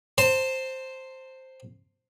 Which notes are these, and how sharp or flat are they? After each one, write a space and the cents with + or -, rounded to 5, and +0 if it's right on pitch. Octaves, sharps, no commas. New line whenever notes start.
C5 +0 A5 +45